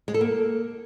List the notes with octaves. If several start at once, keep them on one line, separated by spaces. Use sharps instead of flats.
G#3
A4
A#3